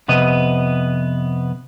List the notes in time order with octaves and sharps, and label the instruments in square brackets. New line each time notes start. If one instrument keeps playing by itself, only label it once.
[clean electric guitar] F2 C3 B3 D#5